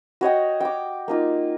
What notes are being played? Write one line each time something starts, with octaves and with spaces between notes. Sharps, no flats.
F#4 C#5 D#5 G5
G5 D6
A#3 D#4 F4